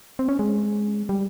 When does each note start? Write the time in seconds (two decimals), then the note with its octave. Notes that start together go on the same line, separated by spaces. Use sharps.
0.19 C4
0.29 C#4
0.39 G#3
1.09 G3